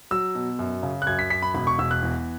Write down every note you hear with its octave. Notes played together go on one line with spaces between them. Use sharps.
F#3 E6
B2
F#2
C#3
F#6
F#2 G#6
B6
F#2 B6
B5
E1 B5
C#6
E1 E6
F#6
E2